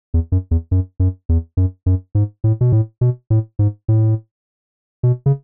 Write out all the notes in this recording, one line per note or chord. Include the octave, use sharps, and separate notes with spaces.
E2
F#2
E2
F#2
F#2
E2
F#2
F#2
G#2
A2
B2
A2
B2
A2
G#2
A2
B2
C#3